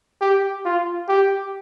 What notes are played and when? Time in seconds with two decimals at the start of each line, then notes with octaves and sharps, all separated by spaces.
0.21 G4
0.65 F4
1.09 G4